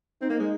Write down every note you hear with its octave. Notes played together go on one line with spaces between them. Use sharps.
C4 D#4
A#3
G#3